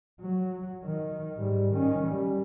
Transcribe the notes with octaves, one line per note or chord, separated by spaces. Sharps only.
F#3
D#3
G#2 G3
D#3 C#4
G3